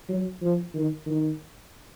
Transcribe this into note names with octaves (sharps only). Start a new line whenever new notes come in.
F#3
F3
D#3
D#3